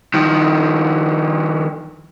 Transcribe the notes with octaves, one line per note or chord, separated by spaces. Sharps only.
D#3 F3